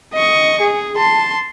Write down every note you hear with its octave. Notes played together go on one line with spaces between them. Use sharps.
D#5 C#6
G#4
A5 C6